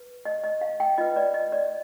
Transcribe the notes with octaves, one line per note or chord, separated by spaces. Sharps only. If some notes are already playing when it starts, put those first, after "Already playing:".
Already playing: B4
D#5
D#5
F5
G5
F4 B4 D#5
D5
D#5
D5